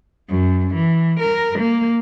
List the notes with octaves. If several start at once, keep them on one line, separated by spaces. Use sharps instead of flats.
F#2
E3
A#4
A#3